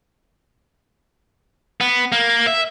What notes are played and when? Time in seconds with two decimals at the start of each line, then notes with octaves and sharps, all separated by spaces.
1.81 B3
2.12 A#3
2.47 E5